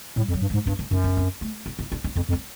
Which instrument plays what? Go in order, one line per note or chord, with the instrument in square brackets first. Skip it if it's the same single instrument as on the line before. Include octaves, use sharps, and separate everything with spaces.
[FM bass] A2 [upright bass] G3
[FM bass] F2
[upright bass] F#3
[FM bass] G2
[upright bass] G#3
[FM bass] G#2
[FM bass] G2 [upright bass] D4
[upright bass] D4
[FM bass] F#2 [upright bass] D#4
[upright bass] D4
C4
A3
D4
D#4
D4
D4
[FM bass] F2 [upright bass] C#4
[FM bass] F2
[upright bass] C4